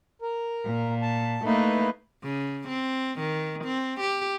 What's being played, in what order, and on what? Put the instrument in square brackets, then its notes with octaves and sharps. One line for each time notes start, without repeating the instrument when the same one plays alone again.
[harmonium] A#4
[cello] A#2
[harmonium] A5
[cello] A3 A#3 [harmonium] D#4 E4 B4
[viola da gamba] C#3
C4
D#3
C4
G4